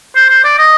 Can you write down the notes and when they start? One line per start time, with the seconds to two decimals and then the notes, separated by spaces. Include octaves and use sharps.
0.15 C5
0.30 C5
0.44 D5
0.59 D#5